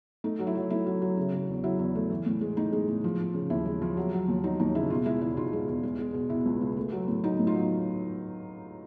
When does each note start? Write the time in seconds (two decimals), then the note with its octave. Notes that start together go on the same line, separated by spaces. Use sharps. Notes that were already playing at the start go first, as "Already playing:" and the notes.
0.24 A3 D#4
0.39 F#3
0.47 E4
0.55 F#3
0.70 A3 E4
0.87 F#3
1.02 F#3
1.17 C#3
1.33 C#3
1.49 E2
1.64 F#3 E4
1.79 E2
1.95 A3
2.11 E3
2.26 A2
2.41 G#3
2.57 A2 D#4
2.73 G#3
2.88 A2
3.04 F3
3.20 F3
3.34 C#3
3.50 D#2 E4
3.66 G#3
3.82 F3
3.97 F#3
4.12 F#3
4.28 D#2
4.44 F#3 D#4
4.59 D#2 D#4
4.75 C#3 E4
4.90 B2 D#4 F4
5.06 G#3 E4
5.21 E2 E4
5.37 B2 D#4 F4
5.53 G#3
5.68 E2
5.83 G#3
5.99 G#3
6.14 B2
6.30 B2 E4
6.46 C#2
6.61 C#2
6.77 A3
6.92 F#3
7.08 A2
7.24 F#3 D#4
7.39 A2
7.47 D#4 F4
7.54 F#3